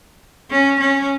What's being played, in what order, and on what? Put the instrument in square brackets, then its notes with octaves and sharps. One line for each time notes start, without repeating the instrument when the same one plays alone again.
[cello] C#4
C#4